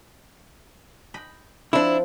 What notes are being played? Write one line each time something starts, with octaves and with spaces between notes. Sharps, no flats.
D#5 G5 B5
F3 C4 D4 E4